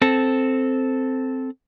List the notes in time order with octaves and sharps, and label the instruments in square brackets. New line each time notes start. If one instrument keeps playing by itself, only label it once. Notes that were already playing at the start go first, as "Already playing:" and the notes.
[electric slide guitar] C4 A4